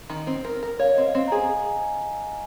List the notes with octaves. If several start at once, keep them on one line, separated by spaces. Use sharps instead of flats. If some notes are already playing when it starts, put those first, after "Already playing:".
D#3
C4
A#4
A#4
C#5 F5
D#5
C4
F5
C4
A#5
G#4 G#5